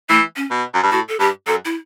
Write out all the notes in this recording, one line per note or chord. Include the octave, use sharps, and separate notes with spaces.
E3 A3
C#4
B2
F#2
G2
A2 F#4
A4
G2 G4
F#2 A4
E4